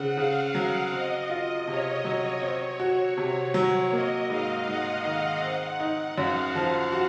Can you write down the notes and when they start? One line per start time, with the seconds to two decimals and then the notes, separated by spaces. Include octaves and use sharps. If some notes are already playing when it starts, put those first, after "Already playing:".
Already playing: C#3 C4 F#5
0.17 C#3 F5
0.55 F#3
0.92 C4 D#5
1.30 F4
1.67 C3 C#5
2.05 F#3
2.42 C4 C#5
2.80 F#4
3.17 C3
3.54 F#3
3.92 A#3 D#5
4.30 G#2 F5
4.68 G#2 F#5
5.05 D#3 F5
5.42 C4 F#5
5.80 D#4
6.17 F#2 F5
6.55 F3
6.92 F#4